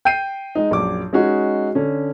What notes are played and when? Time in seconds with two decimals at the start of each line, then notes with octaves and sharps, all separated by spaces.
0.05 G5 G6 C7 D#7
0.55 G#3 D#4
0.71 A#1 F#2 D6
1.13 G#3 C#4 D#4 F#4 G#4
1.75 D3 C#4